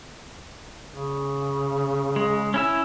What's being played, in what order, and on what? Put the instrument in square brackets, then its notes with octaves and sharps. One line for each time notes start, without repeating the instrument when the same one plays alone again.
[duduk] C#3
[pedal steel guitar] G#3
C#4 E4 E6